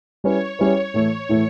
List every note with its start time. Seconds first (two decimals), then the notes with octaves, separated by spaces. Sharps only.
0.24 G3 C#4 E4 B4 C#5
0.59 G3 C#4 E4 B4 C#5
0.94 A2 E3 A3
1.29 A2 E3 A3